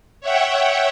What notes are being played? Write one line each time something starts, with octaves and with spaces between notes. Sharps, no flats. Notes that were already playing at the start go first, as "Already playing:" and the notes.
C#5 E5 F#5 G5